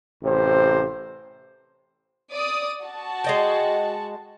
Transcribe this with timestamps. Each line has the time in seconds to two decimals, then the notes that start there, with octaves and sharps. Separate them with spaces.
0.23 A1 C3 C5
2.32 D5 D#6
2.83 F#4 A5
3.24 G#3 D#5 G5